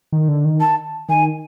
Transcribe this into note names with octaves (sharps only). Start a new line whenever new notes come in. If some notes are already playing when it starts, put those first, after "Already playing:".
D#3
D3
D#3
A5
D#3 G#5